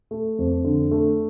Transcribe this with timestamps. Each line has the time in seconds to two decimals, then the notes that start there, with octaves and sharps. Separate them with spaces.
0.11 A3
0.39 F2
0.64 D3
0.91 A3